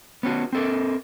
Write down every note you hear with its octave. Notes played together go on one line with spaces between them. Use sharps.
B3 C#4 F#4
C4 A4 A#4